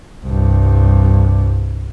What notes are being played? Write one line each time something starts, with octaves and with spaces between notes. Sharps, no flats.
C2 G2